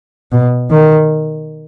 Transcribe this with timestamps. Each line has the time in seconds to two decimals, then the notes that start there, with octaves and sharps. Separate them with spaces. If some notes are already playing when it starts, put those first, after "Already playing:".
0.32 B2
0.70 D#3